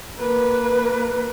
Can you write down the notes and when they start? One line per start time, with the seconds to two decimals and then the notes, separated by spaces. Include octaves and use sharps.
0.19 A#3 B4